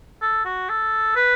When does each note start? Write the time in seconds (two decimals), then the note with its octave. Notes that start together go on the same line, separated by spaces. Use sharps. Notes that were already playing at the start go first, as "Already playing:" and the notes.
0.21 A4
0.45 F#4
0.69 A4
1.16 B4